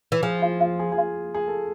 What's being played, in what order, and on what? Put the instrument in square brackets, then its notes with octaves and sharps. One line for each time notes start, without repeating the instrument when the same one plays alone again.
[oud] E3
[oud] F3 [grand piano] G#4
[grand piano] F4
F4
G#4
G#4
F4
G#4
A4